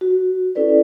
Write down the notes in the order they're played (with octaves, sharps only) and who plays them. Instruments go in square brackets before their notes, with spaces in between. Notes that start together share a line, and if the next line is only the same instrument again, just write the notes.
[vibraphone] F#4
C#4 E4 A4 B4 D5